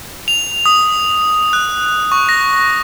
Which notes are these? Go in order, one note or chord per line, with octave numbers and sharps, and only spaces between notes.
F7
D#6
F#6
C#6
A#6